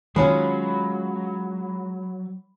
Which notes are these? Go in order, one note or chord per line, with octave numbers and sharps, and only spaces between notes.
D#3 F#3 G#3 C#4 F4 B5